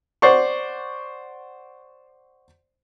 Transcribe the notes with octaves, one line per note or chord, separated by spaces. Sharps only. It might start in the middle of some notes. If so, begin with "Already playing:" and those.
C5 D5 F#5 C#6